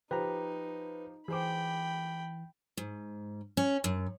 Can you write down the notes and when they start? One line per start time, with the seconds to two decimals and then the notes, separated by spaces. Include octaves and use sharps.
0.11 F3 D#4 G4 B4 A#5
1.28 E3 G#4 C5 G5 B5 D6
2.77 G#2
3.57 C#4
3.84 F#2